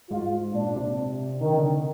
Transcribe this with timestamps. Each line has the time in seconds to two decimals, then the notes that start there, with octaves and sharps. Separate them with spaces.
0.10 G#2 F4
0.54 A#2 D4
0.76 C3
1.41 D3 D#3
1.50 C3
1.58 D3